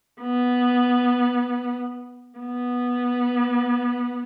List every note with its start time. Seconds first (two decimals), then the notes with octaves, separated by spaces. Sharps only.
0.21 B3
2.39 B3